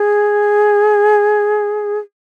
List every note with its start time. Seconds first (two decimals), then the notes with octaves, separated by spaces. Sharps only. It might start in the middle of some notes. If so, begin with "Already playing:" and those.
Already playing: G#4